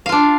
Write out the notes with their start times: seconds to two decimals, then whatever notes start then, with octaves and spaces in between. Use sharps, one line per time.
0.06 F5
0.09 F4
0.12 D4